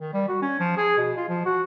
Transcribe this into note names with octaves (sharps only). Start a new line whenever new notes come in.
D#3
G3
F#4
C#4
F3
G#4
B2
F4
F3
F#4